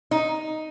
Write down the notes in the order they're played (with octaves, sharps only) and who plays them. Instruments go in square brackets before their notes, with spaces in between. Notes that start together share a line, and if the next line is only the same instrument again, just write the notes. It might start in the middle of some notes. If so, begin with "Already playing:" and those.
[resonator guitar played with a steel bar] D#4